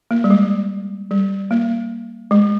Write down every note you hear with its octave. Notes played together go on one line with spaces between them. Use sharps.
A#3
G3
G#3
G3
A#3
G#3